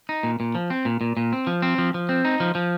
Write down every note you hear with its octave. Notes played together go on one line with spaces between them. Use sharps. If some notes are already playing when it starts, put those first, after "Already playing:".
D#4
A#2
A#2
F3
C4
A#2
A#2
A#2
C4
F3
C4
F3
F3
C4
D#4
F3
F3